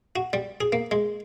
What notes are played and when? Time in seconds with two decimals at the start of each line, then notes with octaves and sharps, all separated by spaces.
0.16 F#4
0.33 G3
0.61 G#4
0.72 A#3
0.91 G#3